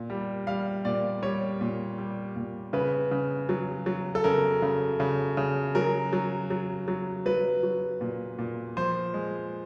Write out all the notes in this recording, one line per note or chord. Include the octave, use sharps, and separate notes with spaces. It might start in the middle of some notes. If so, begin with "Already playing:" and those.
Already playing: A#2
G3
G3 F5
A#2 D5
G3 C#5
A#2
G3
A#2
C#3 B4
C#3
F#3
F#3
A4
C#3 A#4
C#3
C#3
C#3
F#3 A#4
F#3
F#3
F#3
F#3 B4
F#3
A#2
A#2
F3 C5
G#3